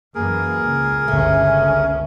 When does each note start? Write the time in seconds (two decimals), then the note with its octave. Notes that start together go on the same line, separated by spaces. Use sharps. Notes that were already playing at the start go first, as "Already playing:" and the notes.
0.15 F#2 E3 A#3 G#4 A#4
0.66 C#2
1.08 G1 C#2 A3 C#4